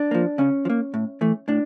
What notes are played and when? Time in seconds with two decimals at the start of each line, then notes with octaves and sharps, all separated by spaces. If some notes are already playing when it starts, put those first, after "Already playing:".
Already playing: D4
0.11 F3 A#3
0.38 C#3 C#4
0.65 F3
0.70 A#3
0.94 A2
1.21 E3 A3
1.48 A2 D4